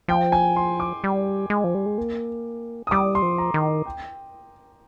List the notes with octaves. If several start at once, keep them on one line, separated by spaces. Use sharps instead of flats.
F3 G5
G#5
C6
D6
G3
G#3
F3
G3
G#3
A#3
D#6
G3 D6
C6
F3
A#5
D#3
G5